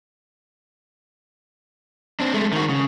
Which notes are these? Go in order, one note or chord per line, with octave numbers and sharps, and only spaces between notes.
C4 D4
G#3 A3
D#3 F#4
C#3